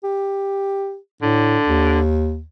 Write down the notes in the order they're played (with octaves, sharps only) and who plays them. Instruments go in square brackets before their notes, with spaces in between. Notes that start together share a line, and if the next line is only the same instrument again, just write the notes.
[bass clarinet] G4
[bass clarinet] A2 [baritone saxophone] D3
[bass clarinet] D#2